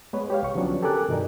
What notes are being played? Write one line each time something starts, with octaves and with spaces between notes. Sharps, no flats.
G#3 B3 B4 C#5
G4 C#5 F5
C2 C#6
D3 F3 F#3 B3 C#4 D4
G4 A4 A#4 G#5 D6 F#6
G2 B2 D#3 D#4 A#4 D5